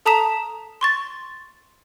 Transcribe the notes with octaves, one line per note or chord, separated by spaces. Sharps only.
A4 A5 A#5 D#6 B6 E7
C6 C#6 A6